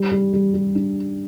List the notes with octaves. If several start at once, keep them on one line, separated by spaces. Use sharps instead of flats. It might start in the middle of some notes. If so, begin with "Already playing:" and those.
Already playing: G3
G3
G3
G3
D4